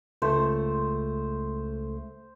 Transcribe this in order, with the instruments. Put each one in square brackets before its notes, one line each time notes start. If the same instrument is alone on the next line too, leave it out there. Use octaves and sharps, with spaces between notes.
[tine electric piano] C#2 A3 [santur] C5